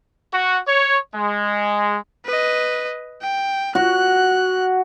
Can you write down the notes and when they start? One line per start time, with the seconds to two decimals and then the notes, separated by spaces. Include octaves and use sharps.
0.32 F#4
0.67 C#5
1.15 G#3
2.26 B4 D#5
3.22 G5
3.75 F#4 F#6